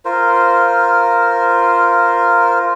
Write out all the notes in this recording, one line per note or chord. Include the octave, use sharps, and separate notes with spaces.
F4 A#4 C5